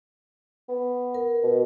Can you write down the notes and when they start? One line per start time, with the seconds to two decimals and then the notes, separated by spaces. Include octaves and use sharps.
0.69 B3
1.14 A#4
1.43 B2